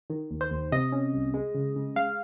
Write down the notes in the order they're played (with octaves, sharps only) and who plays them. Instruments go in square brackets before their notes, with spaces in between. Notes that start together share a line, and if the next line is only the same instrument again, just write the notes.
[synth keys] D#3
D#2
C5
D#2
C3 D#5
C#4
C2
G#3
C#3
C#3
G#3 F5